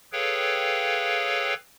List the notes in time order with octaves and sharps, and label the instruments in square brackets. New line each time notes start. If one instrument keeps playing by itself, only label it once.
[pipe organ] G#4 A4 B4 C#5 F5 G5